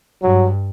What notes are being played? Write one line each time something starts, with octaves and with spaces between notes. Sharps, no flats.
G2 F#3